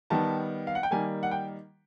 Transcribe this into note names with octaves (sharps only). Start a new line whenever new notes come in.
D#3 G3 B3 A5
F5
F#5
G5
D#3 G3 A#3 G#5
F#5
G5